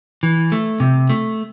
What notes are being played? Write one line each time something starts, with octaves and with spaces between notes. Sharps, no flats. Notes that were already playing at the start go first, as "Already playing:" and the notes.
E3
A3
C3
A3